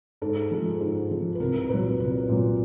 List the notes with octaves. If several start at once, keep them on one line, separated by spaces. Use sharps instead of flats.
G#2 A4
F3 G#3
G#2
F3 G#3
B4
C2 A#4
A#2 F#3 B4
C2 B4
A#2 F#3